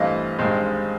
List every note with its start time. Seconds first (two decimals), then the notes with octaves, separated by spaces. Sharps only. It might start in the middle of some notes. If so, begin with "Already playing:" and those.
Already playing: G2 E3 A3 C4 D#5 F5
0.39 G2 D#3 G#3 C4